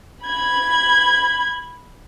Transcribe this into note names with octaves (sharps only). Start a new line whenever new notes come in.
B5 G#6